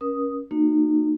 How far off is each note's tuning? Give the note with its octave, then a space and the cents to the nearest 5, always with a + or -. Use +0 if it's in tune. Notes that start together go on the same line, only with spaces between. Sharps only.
C#4 +0 A#4 +40 D#6 +0
A#3 -30 D#4 -30 F#4 -15